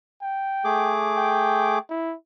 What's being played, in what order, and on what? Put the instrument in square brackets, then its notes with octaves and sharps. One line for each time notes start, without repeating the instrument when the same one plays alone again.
[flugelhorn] G5
[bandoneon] A3 G#4 D6
[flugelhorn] G5
E4